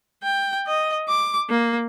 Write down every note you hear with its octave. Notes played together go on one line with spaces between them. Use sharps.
G5
D#5
D6
A#3